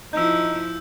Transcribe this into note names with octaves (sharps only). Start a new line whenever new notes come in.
F3 D#4 E4 E6 G6